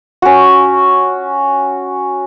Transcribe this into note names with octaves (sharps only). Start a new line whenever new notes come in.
C#4 F#4